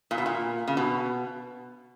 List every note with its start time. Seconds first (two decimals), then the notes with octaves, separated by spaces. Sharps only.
0.11 A#2
0.18 B2
0.26 A#2
0.68 C#3
0.77 B2